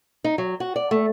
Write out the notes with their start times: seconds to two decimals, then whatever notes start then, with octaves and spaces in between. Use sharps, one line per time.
0.24 D#4
0.38 F#3
0.60 F#4
0.76 D5
0.91 A3